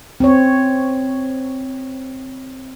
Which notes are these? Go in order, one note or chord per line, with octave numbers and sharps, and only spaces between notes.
C4 C#5